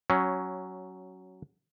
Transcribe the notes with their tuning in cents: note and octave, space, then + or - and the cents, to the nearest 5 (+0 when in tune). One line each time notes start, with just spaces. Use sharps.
F#3 +10 C#4 +0